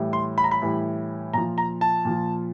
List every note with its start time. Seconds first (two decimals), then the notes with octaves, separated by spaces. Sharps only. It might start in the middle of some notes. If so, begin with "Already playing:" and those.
Already playing: A2 E3 G3
0.13 C6
0.38 B5
0.44 A#5
0.51 B5
0.62 A2 E3 G3
1.33 A#2 F3 A#5
1.58 A#5
1.81 A5
2.05 A#2 F3